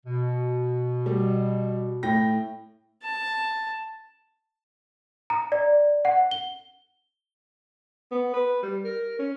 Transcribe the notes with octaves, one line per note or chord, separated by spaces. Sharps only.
B2
G3
A2 G5 A#6
A5
A#5
D5
F#5
G7
B3
B4
G3
A#4
C#4